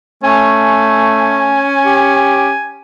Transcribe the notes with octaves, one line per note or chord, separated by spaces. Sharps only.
A3 C#4 G#5
G4